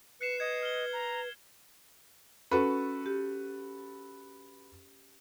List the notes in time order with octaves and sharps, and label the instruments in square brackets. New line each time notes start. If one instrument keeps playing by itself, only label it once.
[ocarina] B4 [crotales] F#6 C7 E7 [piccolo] C#7
[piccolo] D#5 [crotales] G#6 C#7
[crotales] F6 G7
[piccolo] A#5
[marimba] C#4 [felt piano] F#4 A4 B4
[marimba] G4